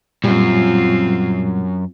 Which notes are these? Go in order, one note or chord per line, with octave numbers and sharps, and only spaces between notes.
F#2 A#2 G3 C4 F4